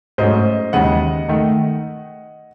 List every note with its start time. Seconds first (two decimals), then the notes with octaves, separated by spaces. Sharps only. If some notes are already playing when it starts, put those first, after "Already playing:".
0.18 G#2 F#3 A3 C#4 C5 D#5
0.73 D#2 C#3 E3 G#3 D#4 D#5 F#5
1.28 D#3 A3 D#4